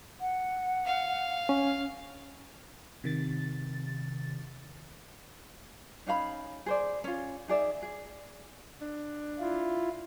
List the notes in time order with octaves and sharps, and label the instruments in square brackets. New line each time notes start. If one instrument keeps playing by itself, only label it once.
[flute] F#5
[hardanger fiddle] F5
[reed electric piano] C#4
[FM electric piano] C3 D#3 A6
[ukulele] C#4 D#4 F5 B5
G#4 C5 D5
C#4 F4
D#4 G#4 D5 E5
G#4
[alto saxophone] D4
[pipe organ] E4 F4